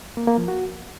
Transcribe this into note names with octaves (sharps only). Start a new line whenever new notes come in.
A#3
A#3
F3
F#4